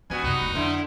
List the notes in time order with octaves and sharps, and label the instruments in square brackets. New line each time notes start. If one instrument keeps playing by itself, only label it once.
[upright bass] E3 [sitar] G3 B3 F#4 [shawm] G#5
[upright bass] F#2 C3 [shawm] D#4
[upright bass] F1 C2
[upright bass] F2 F#3 [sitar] A#2 D3 E4